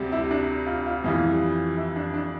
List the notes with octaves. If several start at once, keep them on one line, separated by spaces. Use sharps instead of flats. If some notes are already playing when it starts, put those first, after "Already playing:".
Already playing: D2 C3 G3
E4
D4
F4
F4
F2 E3 G3 F4
E4
D4
D4